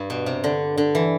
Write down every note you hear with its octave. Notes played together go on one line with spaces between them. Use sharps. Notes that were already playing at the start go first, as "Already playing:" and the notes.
Already playing: G2
B2
C3
D3
D3
E3